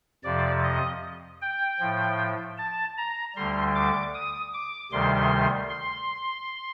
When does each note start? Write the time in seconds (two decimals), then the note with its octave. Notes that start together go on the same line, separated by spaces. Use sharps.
0.24 F2 C3 F3 D5
0.63 D#5
1.42 G5
1.80 A2 F3
2.58 A5
2.98 A#5
3.35 D2 D3 G3 C6
3.75 D6
4.14 D#6
4.54 D6
4.92 D2 C3 D#3 G3 C6
5.69 C6